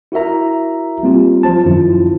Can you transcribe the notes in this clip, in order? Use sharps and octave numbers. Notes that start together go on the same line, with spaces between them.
E4 F#4 A#4 E5 A#5
G3 A#3 C4 F4 G4
F3 F4 C5 A5
F#2 D#3 F3 E4 F4